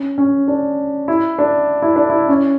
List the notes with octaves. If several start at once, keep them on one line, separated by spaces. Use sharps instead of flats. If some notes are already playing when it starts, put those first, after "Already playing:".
Already playing: C#4
C#4
D4
E4
D4
E4
D4
E4
C#4